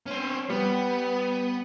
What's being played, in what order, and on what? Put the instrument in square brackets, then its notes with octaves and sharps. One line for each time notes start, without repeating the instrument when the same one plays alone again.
[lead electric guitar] C4 C#4
[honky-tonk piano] G3 [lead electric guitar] B3